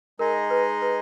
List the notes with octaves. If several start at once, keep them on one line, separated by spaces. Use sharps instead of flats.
G#3 D#4 G#4 A#4 D#5
B4
B4